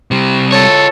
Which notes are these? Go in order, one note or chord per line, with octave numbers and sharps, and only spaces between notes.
C3 G3
F4 A4 C#5